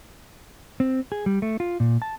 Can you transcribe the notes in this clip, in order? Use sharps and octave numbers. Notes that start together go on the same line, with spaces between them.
C4
G#4
G3
A3
F4
A#2
A5